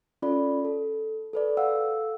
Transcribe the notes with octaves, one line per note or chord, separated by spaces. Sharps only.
C#4 F4 A4 D5 B5
A4
A4 B4 D5
A4 F5 F#5 E6